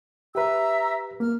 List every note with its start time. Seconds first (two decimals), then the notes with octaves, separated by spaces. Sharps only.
0.35 G4 B4 E5 A#5 E6
1.20 A#3 F6